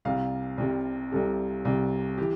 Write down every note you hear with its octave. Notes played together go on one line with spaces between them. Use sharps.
C2 C3 G3 F5
C2 C3 G3
C2 C3 G3 A4
C2 C3 G3
E3 G4